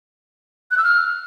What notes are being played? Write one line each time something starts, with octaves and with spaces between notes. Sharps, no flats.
F#6
E6
F6